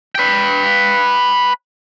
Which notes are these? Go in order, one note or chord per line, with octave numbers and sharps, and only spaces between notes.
B4 G5